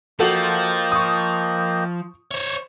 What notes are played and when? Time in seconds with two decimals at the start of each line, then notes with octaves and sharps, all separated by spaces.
0.20 F3 A#3 F#4 A4 D#5 G5
0.92 C#6 D#6
2.31 C5 C#5